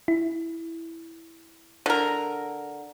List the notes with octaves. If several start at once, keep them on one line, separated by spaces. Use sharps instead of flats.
E4
D3 A#4